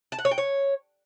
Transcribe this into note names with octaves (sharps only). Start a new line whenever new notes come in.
A5
F#5
C#5
G5
C#5